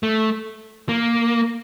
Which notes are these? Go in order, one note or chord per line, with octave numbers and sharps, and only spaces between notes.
A3
A#3